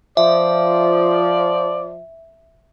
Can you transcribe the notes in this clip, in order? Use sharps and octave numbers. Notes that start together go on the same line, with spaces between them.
F3 D5 E5